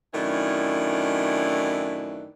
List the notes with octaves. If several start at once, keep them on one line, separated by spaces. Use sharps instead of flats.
F#2 A2 D#3 E3 D4